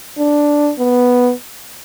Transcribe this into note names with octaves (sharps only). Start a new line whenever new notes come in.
D4
B3